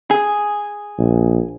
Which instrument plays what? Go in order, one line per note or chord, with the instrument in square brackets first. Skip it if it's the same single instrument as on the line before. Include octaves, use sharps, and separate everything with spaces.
[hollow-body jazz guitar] G#4
[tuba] A#1